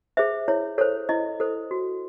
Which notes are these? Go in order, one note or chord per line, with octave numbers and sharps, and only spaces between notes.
G#4 C5 E5
E4 C#5
A4 C5 C#5
E4 D#5
A4 C5
F#4